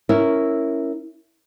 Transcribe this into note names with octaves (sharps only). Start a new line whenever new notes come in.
C#4 E4 A#4